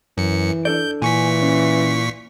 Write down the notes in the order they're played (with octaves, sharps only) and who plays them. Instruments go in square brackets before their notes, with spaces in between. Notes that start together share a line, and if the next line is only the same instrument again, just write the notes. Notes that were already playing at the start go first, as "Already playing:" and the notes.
[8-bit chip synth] F#2 C#7 [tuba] E3
[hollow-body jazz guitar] D4 A4 D5 [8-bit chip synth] G6
[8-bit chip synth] A#2 C#6 B6 [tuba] E3 [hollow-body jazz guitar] G#5
[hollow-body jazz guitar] C#4